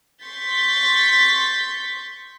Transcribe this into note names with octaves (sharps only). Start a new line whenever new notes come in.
C6 C#6 G6 A6 B6